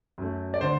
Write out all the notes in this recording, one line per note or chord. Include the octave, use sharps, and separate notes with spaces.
F#2 F#3 A3
D5
D3 C5